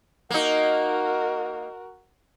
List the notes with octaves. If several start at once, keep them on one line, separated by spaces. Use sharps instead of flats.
A#3 D#4 F#4 A#4